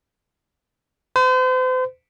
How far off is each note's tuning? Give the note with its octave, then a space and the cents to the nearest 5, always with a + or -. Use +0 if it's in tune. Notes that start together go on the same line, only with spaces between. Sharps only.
C5 -40